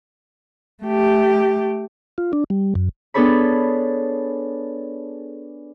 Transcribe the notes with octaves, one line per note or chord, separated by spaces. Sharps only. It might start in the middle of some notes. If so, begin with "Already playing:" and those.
A3 G4
F4
D4
G3
F#2
B3 D4 G#4 A4 C#5 B5